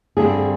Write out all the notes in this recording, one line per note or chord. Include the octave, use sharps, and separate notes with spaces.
G2 D3 G3 C4 G#4